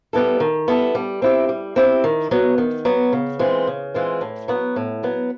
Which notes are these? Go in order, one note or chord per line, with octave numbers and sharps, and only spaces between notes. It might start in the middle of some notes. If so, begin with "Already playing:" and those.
G3 B3 E4 A4
D#3
G3 B3 E4 A4
G3
C4 E4 G4
G3
C4 E4 G4
D#3
F#3 B3
D#3
F#3 B3
C#3
E3 G#3 C4 F4
C#3
E3 G#3 C4 F4
A2
F#3 B3
A2
F#3 B3